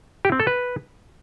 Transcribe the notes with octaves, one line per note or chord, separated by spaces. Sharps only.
G4
C4
A4
B4